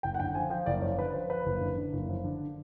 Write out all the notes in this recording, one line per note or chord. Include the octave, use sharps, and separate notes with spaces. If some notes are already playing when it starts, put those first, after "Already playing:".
F#1 G5
F#5
D3 G5
F3 G#5
F3 G5
F#1 D5
F3 C#5
D3 B4
F3 C5
F3 B4
F#1
D3
D3
F#1
F3
D3